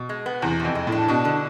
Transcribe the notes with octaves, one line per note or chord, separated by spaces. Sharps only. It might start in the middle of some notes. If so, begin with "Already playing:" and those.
Already playing: B2
G#3
B3
E2 C3
C3
F2
G#3
A2
D4
B2 D4
D3